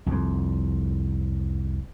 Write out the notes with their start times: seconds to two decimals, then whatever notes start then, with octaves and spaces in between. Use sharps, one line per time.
0.06 C2 F2